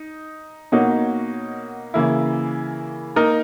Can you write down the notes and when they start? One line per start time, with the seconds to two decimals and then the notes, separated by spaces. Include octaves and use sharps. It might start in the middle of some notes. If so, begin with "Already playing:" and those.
Already playing: D#4
0.72 B2 A#3 D#4 F#4 C#5
1.94 C#3 E3 A#3 E4
3.16 A#3 D#4 A#4